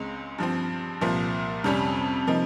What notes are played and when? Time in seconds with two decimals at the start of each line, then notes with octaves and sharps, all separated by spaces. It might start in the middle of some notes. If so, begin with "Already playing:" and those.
Already playing: C#2 C#3 G#3 C4
0.38 G2 F3 C4
1.01 C2 A#2 F3 A#3
1.64 F2 C3 G3 C#4
2.27 C3 F3 A#3 D#4